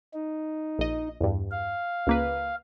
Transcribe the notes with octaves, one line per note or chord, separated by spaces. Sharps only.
D#4
A#1 D#5
E2 G2
F5
C#2 A#3 B4